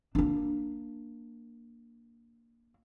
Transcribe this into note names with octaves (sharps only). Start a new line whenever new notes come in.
A#3 D4